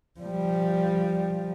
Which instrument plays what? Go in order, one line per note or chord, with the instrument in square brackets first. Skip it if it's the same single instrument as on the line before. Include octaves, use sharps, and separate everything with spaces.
[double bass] F3 G3